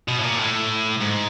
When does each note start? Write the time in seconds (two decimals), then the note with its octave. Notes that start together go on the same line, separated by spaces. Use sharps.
0.08 B2
0.19 A2
0.23 A#2
0.39 A2
1.01 G#2